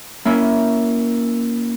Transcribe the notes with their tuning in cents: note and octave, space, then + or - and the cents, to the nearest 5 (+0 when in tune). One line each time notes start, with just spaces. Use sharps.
A#3 +10 C#4 +20 E4 +0